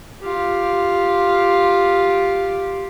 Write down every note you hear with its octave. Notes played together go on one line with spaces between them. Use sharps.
F4 G4